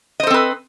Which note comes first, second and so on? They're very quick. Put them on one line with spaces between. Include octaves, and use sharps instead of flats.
D#5 C5 A4 C4 B4